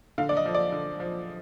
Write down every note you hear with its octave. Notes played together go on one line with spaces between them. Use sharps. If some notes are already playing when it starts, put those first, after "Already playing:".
D3 F5
D5
D#5
F3
D5
D3
F3